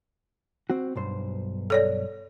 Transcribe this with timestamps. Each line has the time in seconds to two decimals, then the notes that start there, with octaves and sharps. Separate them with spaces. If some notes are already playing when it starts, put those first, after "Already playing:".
0.70 C4 F#4
0.96 B1 G2 C5
1.70 A4 C#5 D5